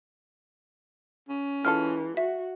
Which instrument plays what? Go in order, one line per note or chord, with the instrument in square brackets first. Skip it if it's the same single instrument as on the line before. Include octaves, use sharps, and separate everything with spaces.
[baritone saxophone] C#4
[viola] E3 [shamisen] G#3 F4 A4 [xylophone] F6
[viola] F#4 [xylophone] E5